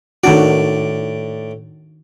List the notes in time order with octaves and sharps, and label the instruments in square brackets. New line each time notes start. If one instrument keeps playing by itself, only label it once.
[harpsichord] A2 D5 [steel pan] D#3 D4 F#4